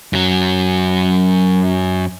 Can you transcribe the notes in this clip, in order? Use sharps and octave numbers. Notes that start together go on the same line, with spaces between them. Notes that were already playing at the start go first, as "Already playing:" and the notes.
F#2 F#3